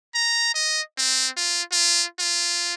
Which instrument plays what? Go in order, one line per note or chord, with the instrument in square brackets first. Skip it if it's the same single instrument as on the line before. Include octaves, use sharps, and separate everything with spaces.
[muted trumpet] A#5
D#5
C4
F4
F4
F4